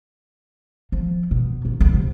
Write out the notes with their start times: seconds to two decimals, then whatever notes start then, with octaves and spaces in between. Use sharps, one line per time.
0.92 F3
1.31 B2
1.65 D#3
1.80 D2
1.94 C3